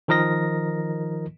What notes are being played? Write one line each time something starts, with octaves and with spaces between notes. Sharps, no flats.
D#3 F3 A#4 D#5 A#6